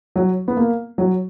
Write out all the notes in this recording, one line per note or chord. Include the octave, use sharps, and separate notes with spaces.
F#3
B3
A#3
F#3